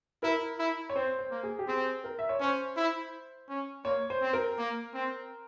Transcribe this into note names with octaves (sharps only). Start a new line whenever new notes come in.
E4 A#4
E4
C#5
C4 C5
C5
A#3
G#4
G4
C4 G#4
A#4
E5
C#5
C#4 C5
E4
C#4
A#3 C#5
C5
C4
A#4
A#3
C4